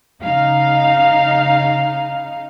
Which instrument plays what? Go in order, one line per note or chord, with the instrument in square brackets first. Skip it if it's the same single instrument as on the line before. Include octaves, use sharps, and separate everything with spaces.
[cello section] C#3 D#4 F5